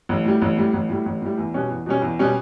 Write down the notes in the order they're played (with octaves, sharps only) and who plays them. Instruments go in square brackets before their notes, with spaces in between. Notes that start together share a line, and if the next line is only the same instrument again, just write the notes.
[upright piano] A1
A2 G3
A1
A2 G3
A1
A2 G3
A1
A2 G3
E2
B2 G3 C#4
E2
B2 G3 C#4
E2
B2 G3 C#4